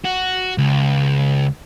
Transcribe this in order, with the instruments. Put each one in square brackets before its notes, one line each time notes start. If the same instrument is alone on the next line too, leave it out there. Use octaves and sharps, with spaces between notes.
[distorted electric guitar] F#4
C#2